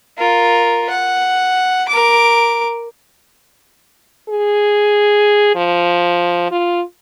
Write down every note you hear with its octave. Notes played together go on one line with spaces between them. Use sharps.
F4 A#4
F#5
A#4 D6
G#4
F3
F4